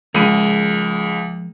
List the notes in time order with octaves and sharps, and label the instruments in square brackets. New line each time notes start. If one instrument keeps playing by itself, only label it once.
[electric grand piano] C#2 B5 D#7 [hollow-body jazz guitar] F3 G#3 A#3